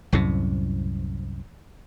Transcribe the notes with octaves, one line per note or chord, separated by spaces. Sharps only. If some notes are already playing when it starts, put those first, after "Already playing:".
C2 F#2 A2 C3